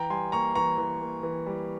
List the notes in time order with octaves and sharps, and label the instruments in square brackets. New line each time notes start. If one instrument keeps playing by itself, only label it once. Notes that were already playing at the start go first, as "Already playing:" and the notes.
Already playing: [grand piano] E3 G5 A#5
G3 G#5 C6
A#3 A#5 C#6
E3 A#5 C#6
E3
A#3
E3
G3